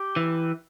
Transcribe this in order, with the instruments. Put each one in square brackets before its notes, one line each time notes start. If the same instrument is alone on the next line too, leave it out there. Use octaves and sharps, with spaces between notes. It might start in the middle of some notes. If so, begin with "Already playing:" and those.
Already playing: [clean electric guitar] G4
E3